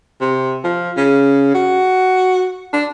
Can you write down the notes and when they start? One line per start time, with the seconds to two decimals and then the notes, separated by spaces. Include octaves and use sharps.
0.21 C3
0.64 F3
0.97 C#3
1.54 F#4
2.73 D4